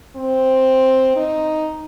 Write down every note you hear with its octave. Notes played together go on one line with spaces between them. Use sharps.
C4
D#4